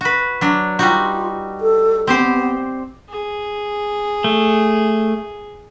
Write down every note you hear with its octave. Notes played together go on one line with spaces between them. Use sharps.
F#4 B4
F#3 D4
G3 D#4 F4 F#4
A4
B3 C4 G4 C5
G#4
A3